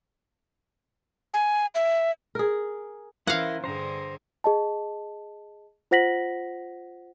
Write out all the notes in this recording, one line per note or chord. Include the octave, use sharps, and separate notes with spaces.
G#5
E5
G#4 A#4
E3 C#4 E4 A#4 C5 F5 F#5
G2 D3 G#4 C5 A#5
G#4 D#5 A5
F4 C5 F#5 A#6 B6 F#7